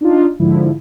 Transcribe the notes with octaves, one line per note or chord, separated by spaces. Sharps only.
D4 D#4 F4
G#2 D3 F3 E4